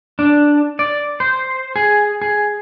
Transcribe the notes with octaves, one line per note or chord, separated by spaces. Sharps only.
D4
D5
C5
G#4
G#4